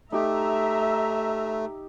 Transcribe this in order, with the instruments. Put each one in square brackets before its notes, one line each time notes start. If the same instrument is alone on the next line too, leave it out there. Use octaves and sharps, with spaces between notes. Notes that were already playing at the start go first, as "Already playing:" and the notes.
[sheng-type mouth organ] A3 [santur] D#4 G4 [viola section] E5 A#5